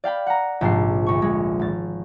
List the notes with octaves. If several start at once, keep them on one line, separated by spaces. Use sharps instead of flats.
D5 F5 G5 B5
F#5 A#5
A#1 G#2 C3 F3 D4 C7
D2 C#6
G#3
G#1 A6